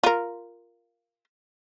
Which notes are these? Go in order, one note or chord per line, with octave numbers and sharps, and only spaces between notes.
F4 A#4